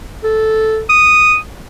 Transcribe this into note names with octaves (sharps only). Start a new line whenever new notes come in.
A4
D#6